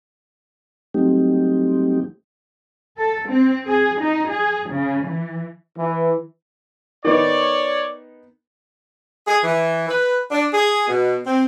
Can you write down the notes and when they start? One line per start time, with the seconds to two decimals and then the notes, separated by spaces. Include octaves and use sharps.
0.94 F#3 G3 A3 C4 D#4 G4
2.98 A4
3.29 C4
3.66 G#4
4.01 D#4
4.29 G#4
4.68 C#3
5.06 E3
5.77 E3
7.05 D#3 B3 D#4 C#5 D5
9.27 G#4
9.43 E3
9.88 B4
10.30 D4
10.53 G#4
10.87 B2
11.27 C4